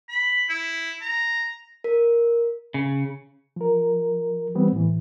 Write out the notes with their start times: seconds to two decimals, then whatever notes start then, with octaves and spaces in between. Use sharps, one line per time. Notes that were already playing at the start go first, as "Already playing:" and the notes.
0.09 B5
0.49 E4
1.01 A#5
1.84 A#4
2.74 C#3
3.56 F3 A#4
4.55 E3 G3 B3 C4
4.72 A2 E3